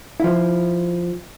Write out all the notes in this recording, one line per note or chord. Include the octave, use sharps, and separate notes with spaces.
F3 E4